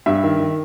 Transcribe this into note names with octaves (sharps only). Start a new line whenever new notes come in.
G2 E5
D#3
D#3